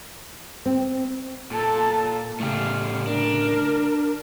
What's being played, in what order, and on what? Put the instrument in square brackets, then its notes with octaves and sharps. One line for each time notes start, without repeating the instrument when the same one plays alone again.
[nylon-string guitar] C4
[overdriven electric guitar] A#2 [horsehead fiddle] A4 A5
[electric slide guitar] A2 C#3 [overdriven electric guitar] A3 G4 [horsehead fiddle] F5
[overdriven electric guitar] D4 [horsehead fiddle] A#4